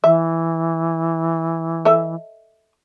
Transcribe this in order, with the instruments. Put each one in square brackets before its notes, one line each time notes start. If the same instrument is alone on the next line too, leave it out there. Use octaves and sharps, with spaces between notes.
[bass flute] E3 [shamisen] E5
[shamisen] A4 D#5 E5